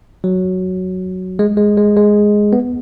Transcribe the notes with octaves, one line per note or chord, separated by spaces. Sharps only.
F#3
G#3
G#3
G#3
G#3
B3